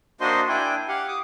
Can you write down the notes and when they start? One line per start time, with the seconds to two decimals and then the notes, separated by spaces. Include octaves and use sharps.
0.21 A#3 D4 F#4 C5 D#5 C6
0.49 D4 E4 G5 G#5
0.88 G4 F5 F#5
1.08 D6 D#6